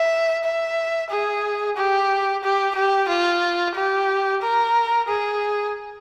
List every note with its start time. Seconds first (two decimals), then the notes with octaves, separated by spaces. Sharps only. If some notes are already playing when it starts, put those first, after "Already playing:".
Already playing: E5
0.44 E5
1.10 G#4
1.76 G4
2.43 G4
2.75 G4
3.08 F4
3.75 G4
4.42 A#4
5.08 G#4